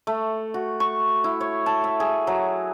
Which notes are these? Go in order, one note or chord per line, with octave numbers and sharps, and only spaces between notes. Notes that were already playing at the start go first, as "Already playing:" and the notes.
A3
F#4
C#6
E4
C#5
A5
E5
G#4
F#3